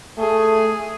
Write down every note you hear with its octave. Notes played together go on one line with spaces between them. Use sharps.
A3 G#4